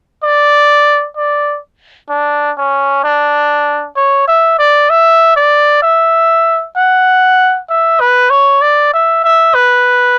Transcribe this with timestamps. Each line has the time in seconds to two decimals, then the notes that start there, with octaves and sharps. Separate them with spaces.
0.24 D5
1.17 D5
2.10 D4
2.57 C#4
3.04 D4
3.96 C#5
4.28 E5
4.59 D5
4.90 E5
5.36 D5
5.82 E5
6.76 F#5
7.70 E5
8.01 B4
8.30 C#5
8.62 D5
8.94 E5
9.24 E5
9.55 B4